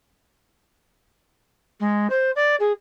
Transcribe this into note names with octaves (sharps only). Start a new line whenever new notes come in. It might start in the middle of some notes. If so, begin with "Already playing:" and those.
G#3
C5
D5
G#4